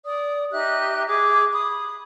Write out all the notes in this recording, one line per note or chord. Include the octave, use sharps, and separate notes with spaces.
D5 D#6
D#4 G4 E5 F#6
G#4 D6
B5 D#6